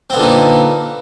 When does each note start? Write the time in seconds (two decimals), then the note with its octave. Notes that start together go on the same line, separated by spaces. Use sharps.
0.10 C4
0.13 B3
0.16 D3
0.19 A#2
0.22 D#4